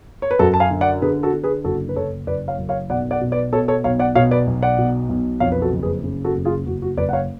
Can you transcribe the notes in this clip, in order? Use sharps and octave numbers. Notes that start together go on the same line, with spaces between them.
C#5
B4
F#2 F#4 A4
A5
F5 G#5
D3
D5 F#5
D3 G#4 B4
F#4 A4
D3
G#4 B4
F#1 F#4 A4
B4
F#1 A4 C#5
F#1 B4 D5
C#5 F5
F#2
C#5 F5
B1 D5 F#5
D5 F#5
B2
B4 D5
B2 A4 C#5
A4 C#5
B1 C#5 F5
D5 F#5
B2 C#5 F5
B4 D5
B1
D5 F#5
B2
B1
F2 C#5 F5
B4
F#4 A4
F#1
G#4 B4
C#3
F#4 A4
F#1
F4 G#4
F#1 F#4
F#4
F#1 B4 D5
F#5
C#5 F5